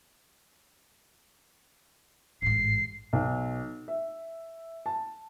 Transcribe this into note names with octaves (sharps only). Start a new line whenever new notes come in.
A1 G#2 C7
B1
E5
A5